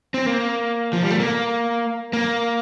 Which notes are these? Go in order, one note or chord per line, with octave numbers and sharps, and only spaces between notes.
C4
A#3
F3
G3
A3
A#3
A#3